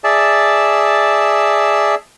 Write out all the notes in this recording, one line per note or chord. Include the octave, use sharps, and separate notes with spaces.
G#4 D5 E5 A5